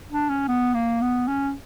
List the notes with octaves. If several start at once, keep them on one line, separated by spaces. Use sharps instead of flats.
D4
C#4
B3
A#3
B3
C#4